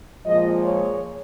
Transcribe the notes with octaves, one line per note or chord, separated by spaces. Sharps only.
A#2 F3 G#3 D#5
C#5